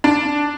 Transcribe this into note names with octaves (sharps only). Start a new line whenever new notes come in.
D4